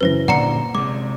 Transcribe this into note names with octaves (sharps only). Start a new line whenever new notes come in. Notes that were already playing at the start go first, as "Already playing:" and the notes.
F#2 C#3 E3 B4 C5 A#6
A#2 D3 D5 F#5 A#5 C#7
C3 G#3 D6